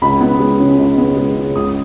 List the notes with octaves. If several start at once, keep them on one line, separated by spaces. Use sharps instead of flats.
C#2 B5
B3
G#3
C#3
C#2
B3
G#3
C#3
C#2 D#6